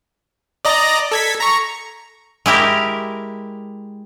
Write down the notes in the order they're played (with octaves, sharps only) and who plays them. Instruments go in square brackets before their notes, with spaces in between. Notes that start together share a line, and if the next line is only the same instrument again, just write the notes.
[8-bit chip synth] D5 D#5 A#5
A4 G#6 B6
A#5 C#6
[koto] G#3 E4 G4 A#4